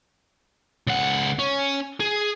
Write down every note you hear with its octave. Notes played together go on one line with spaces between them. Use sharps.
C#2 F#5
C#4
G#4